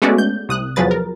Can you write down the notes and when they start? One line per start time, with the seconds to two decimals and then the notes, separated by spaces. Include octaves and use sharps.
0.02 G#3 A3 B3 C#4 F#4 D5
0.18 G6
0.49 C2 D#6 F#6
0.76 E2 F3 F#3 G#4 B4 A6
0.91 A#4